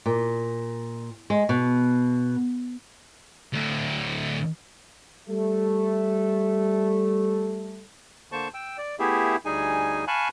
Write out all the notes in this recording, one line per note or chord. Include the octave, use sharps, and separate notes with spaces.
A#2
G#3
B2
D2 A2
G3 A3 A4
D3 A#3 C5 A5 C#6
G5 E6
D5
A3 B3 E4 G4 G#4 E5
D2 G3 D#4 G#4 G#5
F5 G#5 A5 B5 C#6 F#6